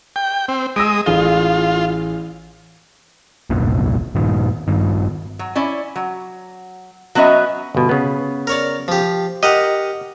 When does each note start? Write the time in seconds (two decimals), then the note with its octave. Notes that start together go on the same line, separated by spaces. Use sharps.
0.16 G5
0.48 C4
0.76 G#3 D#6 E6 A#6 D7
1.06 A1 F4 G#4 G7
3.50 F1 C2 G2 A#2
4.15 G2 A#2 D#3
4.68 G2 D#3
5.39 F#3
5.55 C#4 E4 D5
5.96 F#3
7.15 F#3 B3 C#4 D#5 E5
7.75 G1 B2
7.89 C#3 B3
8.47 A#4 C#5 D5
8.88 F3 G4
9.43 G4 A#4 D#5 F#5